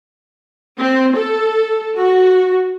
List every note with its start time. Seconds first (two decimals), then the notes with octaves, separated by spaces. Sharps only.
0.80 C4
1.17 A4
1.99 F#4